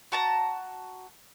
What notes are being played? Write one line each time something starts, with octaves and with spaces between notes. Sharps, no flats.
F#4 A5 A#5